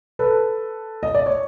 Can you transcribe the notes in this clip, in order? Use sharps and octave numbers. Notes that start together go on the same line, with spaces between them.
A4 B4
D#5
D5
C#5